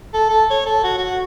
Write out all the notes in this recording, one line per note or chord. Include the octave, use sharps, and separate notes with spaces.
A4
A4
C#5
A4
F#4
F#4